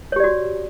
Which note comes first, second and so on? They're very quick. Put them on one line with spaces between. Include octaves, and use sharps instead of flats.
C#5 G4 D5 F#4